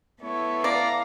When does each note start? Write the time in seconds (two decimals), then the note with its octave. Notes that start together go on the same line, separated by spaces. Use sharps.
0.23 B3 E4 A4 C#5
0.64 D5 F5 A#5